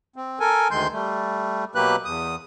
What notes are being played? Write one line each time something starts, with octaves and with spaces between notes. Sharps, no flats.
C4
A4 A#4 G#5
D2 D#3 G#3 C6 G6
G3 A3
B2 F#3 A#3 G4 B4 F#6
E2 D#6